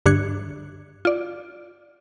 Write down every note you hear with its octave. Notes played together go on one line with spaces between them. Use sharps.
G2 D3 D4 F#6 G#6 C#7
F4 D5